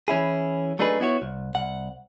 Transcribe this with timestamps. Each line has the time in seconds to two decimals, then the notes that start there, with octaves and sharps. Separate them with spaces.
0.08 E3 C#4 E4 G#4
0.79 F#3 A3 D4 D#4 G#4 B4
1.00 B3 E4 F#4 C#5
1.22 C2
1.55 C2 F#5